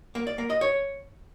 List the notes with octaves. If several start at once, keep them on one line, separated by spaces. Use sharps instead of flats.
A#3
D5
A#3
D#5
C#5